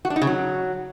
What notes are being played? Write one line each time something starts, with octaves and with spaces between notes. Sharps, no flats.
F#4
D4
D#4
C#3
F#3